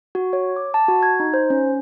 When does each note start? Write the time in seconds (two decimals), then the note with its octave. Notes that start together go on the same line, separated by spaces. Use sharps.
0.15 F#4
0.33 C#5
0.56 D6
0.74 A5
0.88 F#4
1.03 G#6
1.20 D#4
1.34 C5
1.50 C#4